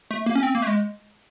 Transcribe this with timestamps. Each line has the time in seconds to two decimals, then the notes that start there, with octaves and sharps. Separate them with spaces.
0.11 A3
0.26 A#3
0.35 C#4
0.43 C4
0.55 A#3
0.62 A3
0.67 G#3